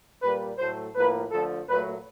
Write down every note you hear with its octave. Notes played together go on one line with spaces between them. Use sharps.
A#2 G3 A#3 B4
A2 F#3 A3 C5
A2 F3 A#3 B4
D3 F3 A3 A4
A#2 F#3 A3 B4